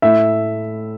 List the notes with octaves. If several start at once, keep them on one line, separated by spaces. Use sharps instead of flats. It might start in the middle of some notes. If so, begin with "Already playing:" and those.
A2 A3 E5